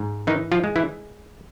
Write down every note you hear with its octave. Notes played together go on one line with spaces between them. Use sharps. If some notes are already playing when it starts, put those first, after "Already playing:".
Already playing: G#2
D#3 E3 D#4
F3 F4
G#3
E3 E4